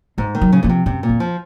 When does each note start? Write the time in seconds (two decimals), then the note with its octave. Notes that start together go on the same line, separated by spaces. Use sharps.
0.18 G#2 G#3
0.35 D#3
0.41 F#3
0.53 C#3
0.63 A#2 F3
0.69 C3
0.86 F#2 C3
1.03 A#2
1.09 F2
1.20 F3